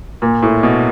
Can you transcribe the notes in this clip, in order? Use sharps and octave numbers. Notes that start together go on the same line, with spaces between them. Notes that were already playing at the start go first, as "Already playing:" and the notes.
A#2
A2
B2